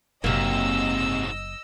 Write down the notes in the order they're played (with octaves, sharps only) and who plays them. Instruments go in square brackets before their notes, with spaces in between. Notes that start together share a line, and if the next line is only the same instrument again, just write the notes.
[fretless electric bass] F#1 [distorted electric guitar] G#2 F#3 [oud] C3 A#3 [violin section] D#5 E6